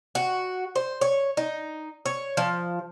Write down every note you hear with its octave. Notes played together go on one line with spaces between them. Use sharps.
F#4
C5
C#5
D#4
C#5
F3